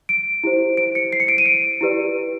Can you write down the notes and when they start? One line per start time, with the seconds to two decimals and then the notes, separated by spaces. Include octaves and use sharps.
0.09 D7
0.44 E4 G4 C5
0.77 D7
0.95 C#7
1.13 C7
1.20 C#7
1.28 D7
1.38 D#7
1.46 D7
1.81 E4 G4 B4 D5